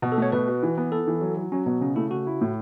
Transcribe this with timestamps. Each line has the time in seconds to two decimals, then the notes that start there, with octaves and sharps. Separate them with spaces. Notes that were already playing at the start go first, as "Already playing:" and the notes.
0.02 B2 B3
0.12 A4
0.18 A3 C#5
0.32 B2 B4
0.48 F#4
0.63 E3
0.77 B3
0.92 B3 A4
1.07 E3
1.21 F#3
1.37 F#3
1.52 F#3 C#4
1.66 B2 B3
1.81 C#3 C#4
1.96 A3 E4
2.11 C#3 F#4
2.27 E4
2.41 A2